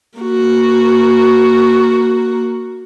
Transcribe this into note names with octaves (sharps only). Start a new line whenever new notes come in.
A#3 F#4